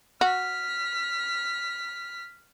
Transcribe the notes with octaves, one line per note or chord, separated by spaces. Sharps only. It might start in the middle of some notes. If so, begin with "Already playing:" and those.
F#4 F6 B6